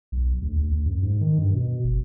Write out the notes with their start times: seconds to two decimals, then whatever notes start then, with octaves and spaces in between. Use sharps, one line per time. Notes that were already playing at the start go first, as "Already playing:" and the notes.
0.12 B1
0.42 D2
0.56 D2
0.72 D2
0.86 F#2
1.03 G#2
1.21 D#3
1.39 G2
1.55 B2
1.84 G1